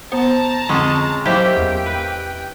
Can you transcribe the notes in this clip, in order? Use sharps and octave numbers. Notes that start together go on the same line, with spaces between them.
B3 C5 A5 A#5
F2 D3 G#3 C#4
F#3 A#3 E4 G4 C5 D#5 E5 G5
E2
B4